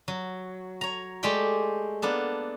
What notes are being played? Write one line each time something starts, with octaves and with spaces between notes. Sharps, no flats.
F#3
C#5 A#5
G#3 A3 G4 D5 G5
A#3 B3 D4 A4